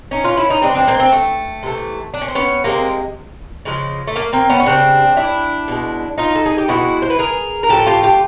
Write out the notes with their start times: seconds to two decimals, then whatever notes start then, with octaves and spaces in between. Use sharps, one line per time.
0.11 C#4 D#4
0.24 F4
0.37 E4
0.50 D#4
0.62 C#3 E3 G#3 C4 D4
0.75 C4 D4
0.87 A#3 C4
1.00 C4 D4
1.12 A3
1.63 C3 E3 A3
2.14 D4
2.22 C#4
2.28 C4
2.35 B3 C#4
2.64 C3 D#3 G#3 A#3 C4
3.65 C#3 F3 G#3
4.07 A3
4.16 A#3
4.33 A#3 C4
4.49 B3 C#4
4.60 C#4
4.66 C#3 E3 G3 C4 D4
5.17 D4 E4
5.68 B2 G#3
6.18 D#4 F4
6.35 A4
6.46 G#4
6.58 G4
6.68 B2 G#3 E4 F#4
7.02 C5
7.10 B4
7.19 G#4 A#4
7.63 A#4
7.69 A2 F3 A3 G4 A4
7.86 F4 G4
8.03 F4 G4